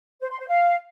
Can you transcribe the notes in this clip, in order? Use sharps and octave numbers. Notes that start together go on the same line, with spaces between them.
C5
C6
C5
F5